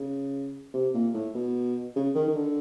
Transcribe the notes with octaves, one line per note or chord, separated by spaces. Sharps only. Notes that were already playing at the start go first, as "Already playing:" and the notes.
Already playing: C#3
C3
A#2
A2
B2
C#3
D#3
D#3
D3